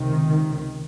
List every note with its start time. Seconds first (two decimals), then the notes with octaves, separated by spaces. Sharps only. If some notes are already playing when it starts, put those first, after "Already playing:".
Already playing: C#2 C3 D#3